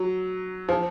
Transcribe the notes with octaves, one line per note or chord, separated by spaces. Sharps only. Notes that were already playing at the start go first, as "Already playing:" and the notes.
Already playing: F#3
F3